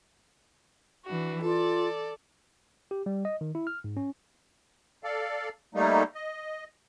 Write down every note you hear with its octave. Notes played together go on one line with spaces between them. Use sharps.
E3 D4 F#4
F4 A4 D5
G4
G3
D#5
D#3
E4
F6
G#2
C#4
A4 D5 F5
G3 A3 A#3 D#4
D#5